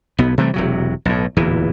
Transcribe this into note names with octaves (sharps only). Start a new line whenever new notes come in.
B1 B3
C3 E3 G3 A3
E1 C3 F#3
B1 A2
D1 E2 A#2 E3